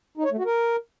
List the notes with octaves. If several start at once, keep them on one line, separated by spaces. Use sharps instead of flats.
D#4
C#5
A3
F#4
A#4